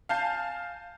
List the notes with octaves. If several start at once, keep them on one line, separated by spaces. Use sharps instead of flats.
F5 G#5 A5 G6 C7